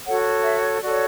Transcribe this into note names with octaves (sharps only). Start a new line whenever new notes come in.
F#4 A4 C#5 F#5
E5
F#4 A4 C#5 D5